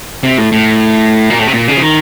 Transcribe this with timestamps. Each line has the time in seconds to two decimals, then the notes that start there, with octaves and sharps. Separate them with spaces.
0.23 C3
0.38 A2
0.52 A2
1.30 A#2
1.39 A2
1.47 C3
1.54 A#2
1.68 C#3
1.77 F3
1.82 D#3